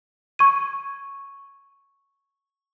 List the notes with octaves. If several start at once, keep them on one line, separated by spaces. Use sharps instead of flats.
C#6 G#6 D#7